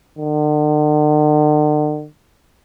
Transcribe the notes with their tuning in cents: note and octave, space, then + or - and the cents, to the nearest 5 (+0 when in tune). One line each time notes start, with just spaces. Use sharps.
D3 +45